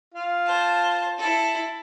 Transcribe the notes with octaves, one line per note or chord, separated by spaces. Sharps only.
F4
C5 A5
E4 A4